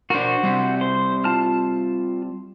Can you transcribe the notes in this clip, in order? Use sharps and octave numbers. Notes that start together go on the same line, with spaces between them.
D4 F#4 A#4 C5
G3 C4
C5
F4 A5 F6